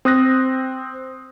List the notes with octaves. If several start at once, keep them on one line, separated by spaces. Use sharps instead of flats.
C4 D#6 F#6 A#6